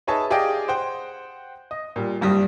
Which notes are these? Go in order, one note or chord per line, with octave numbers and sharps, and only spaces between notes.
D#4 G#4 B4 C#5 E5 A5
G4 G#4 D5 D#5 F5 G5
C5 F#5 G5
D#5
A#2 G3
F#1 G2 G3 D#6